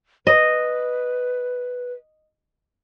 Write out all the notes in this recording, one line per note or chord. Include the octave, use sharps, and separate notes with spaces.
B4 D#5